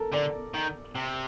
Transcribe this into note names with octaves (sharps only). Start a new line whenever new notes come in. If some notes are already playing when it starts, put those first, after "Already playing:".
Already playing: A4 A#4
D3 D5
D#3
C3